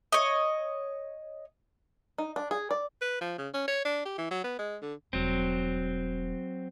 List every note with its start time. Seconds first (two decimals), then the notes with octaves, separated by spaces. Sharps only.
0.12 C#5 D#5
2.18 D#4
2.36 D4
2.51 G#4
2.71 D5
3.02 B4
3.21 F3
3.38 C#3
3.54 C#4
3.68 C#5
3.85 D4
4.05 G4
4.18 E3
4.31 F#3
4.44 B3
4.59 G#3
4.82 D3
5.13 E1 F#3 G3 C4